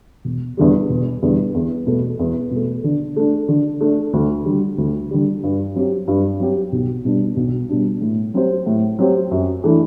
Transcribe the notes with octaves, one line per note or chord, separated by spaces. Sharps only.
E1
E2 D3 G3
E1
E2 D3 G3
E2
B2 A3
E2
B2 A3
D3
A3 D4
D3
A3 D4
D2
D3 G3
D2
D3 G3
G2
F#3 C4 G4
G2
F#3 C4 G4
B1
B2 G3 D4
B1
B2 G3 D4
A2
F#3 C4 G4 C5
A2
F#3 C4 G4 C5
F#2
E3 A3 D4